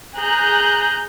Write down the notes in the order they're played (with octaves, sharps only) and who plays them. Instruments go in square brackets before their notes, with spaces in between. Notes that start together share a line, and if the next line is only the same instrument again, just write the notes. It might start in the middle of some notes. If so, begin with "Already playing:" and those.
[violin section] G#4 A#5 F#6 G6